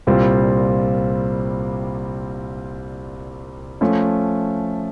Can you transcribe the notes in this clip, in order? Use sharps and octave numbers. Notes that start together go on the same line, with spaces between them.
C2 A#2 G3 C4 F4
F3 A3 C#4